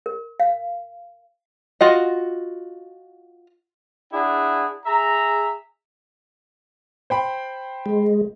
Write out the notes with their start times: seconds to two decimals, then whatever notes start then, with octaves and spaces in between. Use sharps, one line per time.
0.06 A#4
0.40 F5
1.81 F4 F#4 D#5
4.13 D4 E4 G#4 F#5
4.86 G#4 E5 A#5
7.10 C5 G5 B5
7.86 G#3